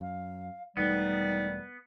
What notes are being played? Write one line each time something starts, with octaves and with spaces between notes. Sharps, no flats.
F#2 F5
E1 E2 D#3 G3 A3 B3 D#4